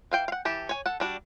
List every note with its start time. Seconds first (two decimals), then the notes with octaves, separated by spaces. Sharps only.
0.11 E3 F5 G5
0.28 F5 F#5
0.45 E3 G4 A5
0.69 C#5 G#5
0.86 A4 F#5
1.00 G3 D4 F#4